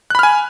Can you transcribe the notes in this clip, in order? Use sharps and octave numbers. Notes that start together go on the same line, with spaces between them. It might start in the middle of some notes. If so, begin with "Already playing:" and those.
G#5 B5 F6 F#6